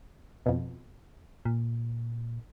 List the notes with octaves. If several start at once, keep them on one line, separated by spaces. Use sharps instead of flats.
F2 B2
A#2